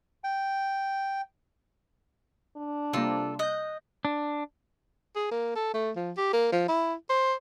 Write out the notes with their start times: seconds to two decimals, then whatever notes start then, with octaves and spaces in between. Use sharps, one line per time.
0.24 G5
2.57 D4
2.93 C3 G3 A#3 F4 A4
3.39 D#5 F#6 G6
4.05 D4
5.15 G#4
5.31 A#3
5.56 A4
5.74 A3
5.96 F3
6.17 G4
6.33 A#3
6.52 F3
6.68 E4
7.09 C5